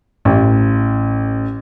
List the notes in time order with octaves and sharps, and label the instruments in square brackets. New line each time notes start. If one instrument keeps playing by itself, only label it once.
[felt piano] A1